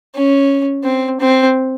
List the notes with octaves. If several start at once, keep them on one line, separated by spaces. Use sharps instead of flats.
C#4
C4
C4